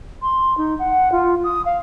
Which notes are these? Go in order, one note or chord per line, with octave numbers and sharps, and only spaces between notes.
C6
D#4
F#5
F4
D#6
F5